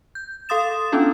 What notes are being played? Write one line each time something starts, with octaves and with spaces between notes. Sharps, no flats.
G6
A4 F5 C6 D#6 A6 E7
B3 C#4 D4 E4 F4 A4